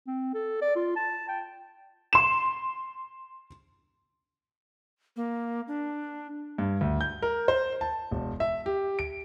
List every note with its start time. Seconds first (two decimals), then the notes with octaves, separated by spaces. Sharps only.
0.07 C4
0.34 A4
0.62 D5
0.76 F4
0.96 A5
1.28 G5
2.13 C6 E7
5.17 A#3
5.68 D4
6.58 G2
6.81 D2
7.01 G6
7.22 A#4
7.48 C5
7.81 A5
8.11 E1
8.40 E5
8.66 G4
8.99 D7